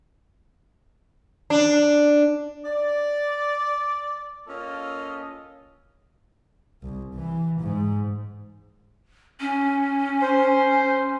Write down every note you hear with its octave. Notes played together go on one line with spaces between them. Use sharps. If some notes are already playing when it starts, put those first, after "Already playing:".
D4
D5
A#3 C#4 F4 A4 D#5
C2
E3
G#2
C#4
C5 C6